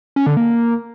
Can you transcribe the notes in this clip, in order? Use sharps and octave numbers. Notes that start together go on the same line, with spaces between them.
C#4
D3
A#3